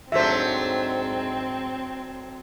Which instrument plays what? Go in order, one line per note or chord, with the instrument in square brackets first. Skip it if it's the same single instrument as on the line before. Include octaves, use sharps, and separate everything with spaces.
[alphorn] G#2 [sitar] F#3 A3 D4 [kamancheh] C4 [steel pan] C5 E5